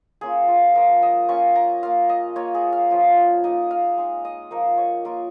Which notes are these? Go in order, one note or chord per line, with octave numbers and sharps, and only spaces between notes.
A#3 C#4 F4 G#4
F4
F3 C#4 F4 A#4
D#5
A#3 C#4 F4 C#6
A#5
A#3 F4 F5
D#5
A#3 F4 C#5
G#4
F5
F3 C#4 F4
A#3 D#4 D#5
F5
G#3 D#4
D#5
F3 A#3 D#4 A#4
C#5
A#3 F4 A#4